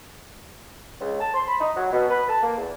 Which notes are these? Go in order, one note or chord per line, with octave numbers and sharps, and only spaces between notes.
C#2
A5
C6
B5
D#4
F#3
B2
B4
A5
A#3
E2